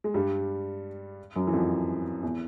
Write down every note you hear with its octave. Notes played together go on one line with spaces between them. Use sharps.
G#3
G2 G3
F#2 F#3
E3
F2 F3
E2 E3